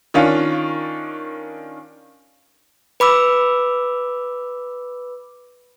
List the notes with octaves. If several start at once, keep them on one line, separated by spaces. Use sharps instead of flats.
D#3 C#4 D4 F4
B4 B5 D6 E6